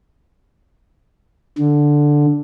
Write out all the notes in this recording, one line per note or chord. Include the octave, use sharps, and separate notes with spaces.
D3